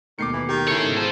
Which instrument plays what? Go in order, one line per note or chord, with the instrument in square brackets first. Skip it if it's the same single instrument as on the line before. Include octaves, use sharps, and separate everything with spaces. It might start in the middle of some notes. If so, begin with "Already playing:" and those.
[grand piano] D#2 B2 A3 [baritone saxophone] D#3 [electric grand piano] D6 C7 C#7
[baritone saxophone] E3
[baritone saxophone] D#3 [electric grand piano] G4
[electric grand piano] E4 A4 [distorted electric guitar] G#4 C#5
[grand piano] G#2 B2 C#4
[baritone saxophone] G#2 [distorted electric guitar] F4 C5 [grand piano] A5